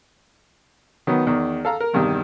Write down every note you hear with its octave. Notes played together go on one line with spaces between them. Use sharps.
D#3 F#3 B3
E2 D#3
A4 F5 A#5
A#4
E2 G2 C3 D#3